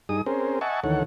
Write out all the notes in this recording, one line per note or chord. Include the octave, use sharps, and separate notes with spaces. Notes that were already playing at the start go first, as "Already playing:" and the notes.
G2 D#4 G#4 D#6
C4 C#4 G#4 A#4 C5
D#5 E5 F#5 G#5 A5 C#6
D2 D#3 E3 A4 C#5 F#5